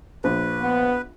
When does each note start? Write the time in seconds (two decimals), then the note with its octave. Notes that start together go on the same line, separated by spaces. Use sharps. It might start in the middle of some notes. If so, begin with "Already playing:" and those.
0.24 A#1 B4
0.62 B3